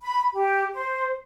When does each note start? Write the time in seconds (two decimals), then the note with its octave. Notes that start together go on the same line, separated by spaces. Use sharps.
0.01 B5
0.32 G4
0.74 C5